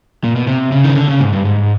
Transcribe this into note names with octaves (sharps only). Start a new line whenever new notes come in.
A#2
B2
C3
C#3
D#3
D3
C#3
G#2
G2
G#2